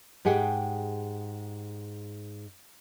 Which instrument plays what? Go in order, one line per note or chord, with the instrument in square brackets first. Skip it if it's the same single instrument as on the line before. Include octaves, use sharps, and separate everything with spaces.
[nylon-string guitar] G#2 G4 G#4 F#5 G5